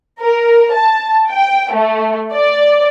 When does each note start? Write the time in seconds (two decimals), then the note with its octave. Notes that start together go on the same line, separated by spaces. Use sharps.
0.21 A#4
0.73 A5
1.30 G5
1.73 A3
2.35 D5